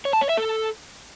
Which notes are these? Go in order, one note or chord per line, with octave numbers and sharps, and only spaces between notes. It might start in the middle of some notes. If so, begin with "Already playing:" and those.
C#5
A5
C#5
E5
A4